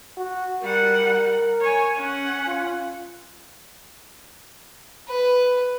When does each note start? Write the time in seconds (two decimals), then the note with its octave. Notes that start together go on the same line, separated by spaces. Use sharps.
0.17 F#4
0.63 G3 A#4 F#5
1.61 C#5 G#5
1.96 C#4 F#5
2.47 F4
5.08 B4